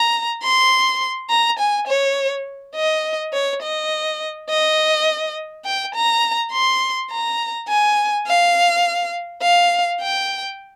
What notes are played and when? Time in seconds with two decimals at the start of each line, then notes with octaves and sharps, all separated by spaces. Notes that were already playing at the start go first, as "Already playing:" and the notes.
Already playing: A#5
0.43 C6
1.30 A#5
1.59 G#5
1.88 C#5
2.76 D#5
3.33 C#5
3.62 D#5
4.49 D#5
5.65 G5
5.95 A#5
6.52 C6
7.11 A#5
7.68 G#5
8.27 F5
9.42 F5
10.01 G5